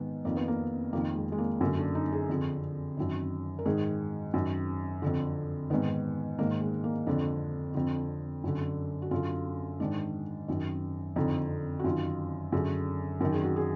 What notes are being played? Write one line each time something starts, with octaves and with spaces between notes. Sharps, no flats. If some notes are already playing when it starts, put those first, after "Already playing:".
Already playing: G#2 D#3 B3
F2 D#3 A#3
B3
A#3
F2 D#3 A#3
G#3
G#3
A#3
F#2 D3 A#3
D4
D#4
G#4
F2 D3
F#2 D#3
A#4
G#2 D#3 G#4
F#2 D#3
F2 D3
G#2 D#3 B3
G#2 D#3 A#3
G#3
A#3
F2 D3 D4
F2 D3
F#2 D3
F#4
F#2 D3 F4
G#2 D#3 D4
F#2 D#3
F2 D3 D#4
F#4
F#2 D#3 F4
F#2 D3 G#4
F#2 D#3 A#4
G#4
F#4
G#4